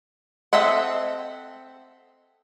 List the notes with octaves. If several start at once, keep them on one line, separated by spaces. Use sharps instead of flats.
C4 A4 D#5 E5 F#5